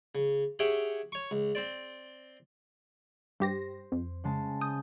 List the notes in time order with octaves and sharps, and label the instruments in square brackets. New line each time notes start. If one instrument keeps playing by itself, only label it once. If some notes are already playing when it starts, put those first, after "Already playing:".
[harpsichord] C#3
G4 G#4 C#5 E5 F#5 G5
C#5 C#6
C#2
C4 C5 D5
[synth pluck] G2 G4 A#6 [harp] C5
[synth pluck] F2
[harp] C#3 G#3 A5
[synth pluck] D#6 [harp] G6